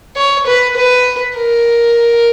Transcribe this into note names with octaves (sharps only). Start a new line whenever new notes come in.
C#5
B4
B4
A#4